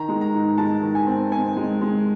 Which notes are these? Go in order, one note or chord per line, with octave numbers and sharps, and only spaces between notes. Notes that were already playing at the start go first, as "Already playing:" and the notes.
Already playing: D#3 A#5
G#3
A#5
G#2
G#3 A5
D#3
G#5
C4
C4 G#5
G#3
G#3